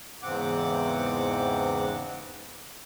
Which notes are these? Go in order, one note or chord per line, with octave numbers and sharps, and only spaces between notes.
E2 G#2 C#3 C4 F#5 D6